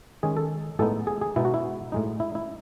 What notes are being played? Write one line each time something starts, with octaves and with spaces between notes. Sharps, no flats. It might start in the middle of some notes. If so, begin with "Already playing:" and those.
D#3 G#3 C#4 G#4
A4
A2 G#3 B3 D#4 A4
G#4
G#4
B2 G#3 B3 D#4 E4
F#4
E4
A2 G#3 D#4
E4
E4